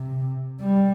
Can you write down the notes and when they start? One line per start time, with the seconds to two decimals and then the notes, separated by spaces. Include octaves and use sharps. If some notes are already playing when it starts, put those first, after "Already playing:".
Already playing: C3
0.61 G3